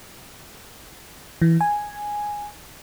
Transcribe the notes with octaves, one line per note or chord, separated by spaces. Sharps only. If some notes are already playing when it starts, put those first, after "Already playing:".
E3
G#5